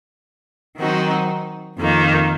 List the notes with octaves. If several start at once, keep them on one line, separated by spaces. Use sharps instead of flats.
D#3 F#3 C4 D#4 F#4
F2 D#3 A#3